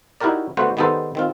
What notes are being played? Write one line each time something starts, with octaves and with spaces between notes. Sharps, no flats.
D#4 E4 F#4 G4 A#4 D5
D3 A3 B3 F#4 C5
D#3 G3 B3 D#4 A4 C5
D#3 C4 F4